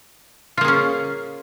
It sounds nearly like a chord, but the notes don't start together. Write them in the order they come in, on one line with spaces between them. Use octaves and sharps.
F4 A#3 G#4 C#4